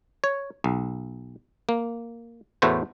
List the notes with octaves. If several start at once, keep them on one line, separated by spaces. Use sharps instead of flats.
C#5
B1
A#3
E2 A2 A3 F#4 B4 C5